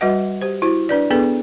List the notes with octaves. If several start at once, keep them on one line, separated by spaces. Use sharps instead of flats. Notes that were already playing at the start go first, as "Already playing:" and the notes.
G3 F#4 B4 D#5 F#5
G4 C5
E4 F#4 C5
D4 B4 D5
B3 D4 G#4 A4 B4